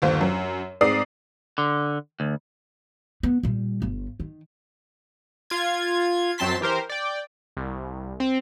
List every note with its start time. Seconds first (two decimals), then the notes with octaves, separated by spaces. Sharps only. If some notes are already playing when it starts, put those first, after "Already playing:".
0.02 G1 D#2 C5
0.21 F#2
0.81 G#2 C4 D5 D#6 C7
1.58 D3
2.20 D2
3.23 B3
3.43 A#2 G3
3.82 G1
4.20 D#3
5.50 F4 G#6
6.38 F#2 F#3 C4 A5 C6 B6
6.61 E3 G4 A#4 C5
6.89 D5 G5
7.57 C2
8.20 C4